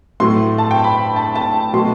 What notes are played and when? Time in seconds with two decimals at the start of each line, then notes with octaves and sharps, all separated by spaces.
0.20 A2 F#3 A3 C6
0.58 A5
0.71 G5
0.84 B5
1.16 A5
1.35 A5
1.73 B2 F#3 A3 C6